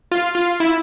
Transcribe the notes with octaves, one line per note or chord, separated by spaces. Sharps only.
F4
F4
E4